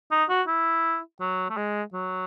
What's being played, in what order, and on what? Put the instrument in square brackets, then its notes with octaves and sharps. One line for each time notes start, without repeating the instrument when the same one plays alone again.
[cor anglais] D#4
F#4
E4
F#3
A3
G#3
F#3